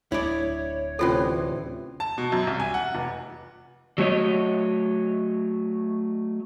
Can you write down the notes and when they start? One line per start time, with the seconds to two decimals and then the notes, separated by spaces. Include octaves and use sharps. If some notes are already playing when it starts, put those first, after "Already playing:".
0.12 D1 D4 E4 C#5 D5
0.99 D2 C3 E3 C#4 F4 A4
2.00 A5
2.18 B2
2.32 F#2
2.47 C2
2.60 G#5
2.74 F#5
2.95 F1
3.98 F#3 A3 C#5 D#5